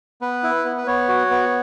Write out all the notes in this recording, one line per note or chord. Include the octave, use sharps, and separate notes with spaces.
B3 B4
E4
B3
B4
B3 C#5
F#4
B3